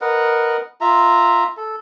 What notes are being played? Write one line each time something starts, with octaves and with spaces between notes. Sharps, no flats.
A#4 B4 D#5 F#5
F4 E5 A#5
A4